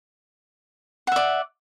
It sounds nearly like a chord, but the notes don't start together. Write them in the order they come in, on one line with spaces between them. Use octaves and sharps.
F#5 E5 D5